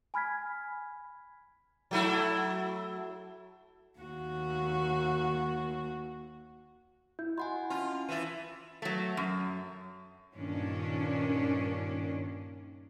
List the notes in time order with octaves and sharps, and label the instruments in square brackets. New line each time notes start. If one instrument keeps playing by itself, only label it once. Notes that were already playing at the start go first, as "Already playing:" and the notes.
[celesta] G#5 B5 F6 G#6 B6
[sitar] F#3 A3 E4
[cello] D#2 F#4
[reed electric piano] E4 [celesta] G6
[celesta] F#4 B5 C6 [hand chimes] D#5 F#5 G#5
[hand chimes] C#4 A5 [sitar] F4
[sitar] E3 E4 [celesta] A6 D#7
[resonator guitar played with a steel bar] F#3 A3
F#2
[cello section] G2 A#2 D#3 C#4 D4